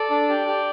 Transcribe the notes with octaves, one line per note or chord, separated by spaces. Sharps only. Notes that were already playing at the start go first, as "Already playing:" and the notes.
Already playing: A4 D5
D4
G4
G4